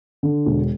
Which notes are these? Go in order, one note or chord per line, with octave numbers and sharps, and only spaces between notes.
D3
E1